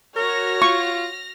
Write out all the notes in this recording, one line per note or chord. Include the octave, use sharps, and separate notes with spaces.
F#4 A#4 C#5 F6 A#6
F4 C#6